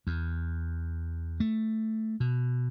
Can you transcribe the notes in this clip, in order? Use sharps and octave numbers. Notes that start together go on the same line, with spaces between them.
E2
A3
B2